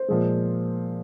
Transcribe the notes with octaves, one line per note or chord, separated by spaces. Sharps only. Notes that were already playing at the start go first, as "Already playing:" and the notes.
Already playing: C5
A#2 F3 G#3